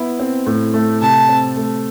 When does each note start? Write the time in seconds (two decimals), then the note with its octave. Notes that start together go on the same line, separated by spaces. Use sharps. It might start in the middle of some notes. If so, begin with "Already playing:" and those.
Already playing: B3 E4
0.19 C4
0.46 A2
0.74 A3
1.01 C3 A5
1.29 C4
1.56 A3